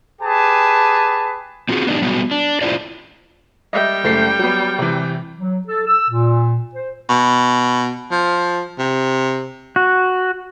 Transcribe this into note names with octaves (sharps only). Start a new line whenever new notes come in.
G4 G#4 B4 A5
C4 F4 F#4 G#4
B3 D4 D#4 G4
F#3 G3 B3 F#4
D4
E4 F4 C5 D5
G3 D#5 E5 G5
F#1 A3 C7
F#3 B3
C3 E3
F#3
A4
E6
A#2
C5
B2
F3
C3
F#4